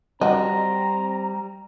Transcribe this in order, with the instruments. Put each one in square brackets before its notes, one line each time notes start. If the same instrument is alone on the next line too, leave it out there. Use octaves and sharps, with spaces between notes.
[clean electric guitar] G3 [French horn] C4 [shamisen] F#4 D#5 [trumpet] A#5